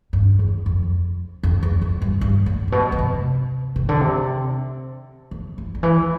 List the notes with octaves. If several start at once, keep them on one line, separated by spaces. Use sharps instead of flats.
G2
E2
F2
F2
E2
F2
G2
G2
A2
A2
B2
D3
C3
C3
D3
C3
D3
E3
D3
E3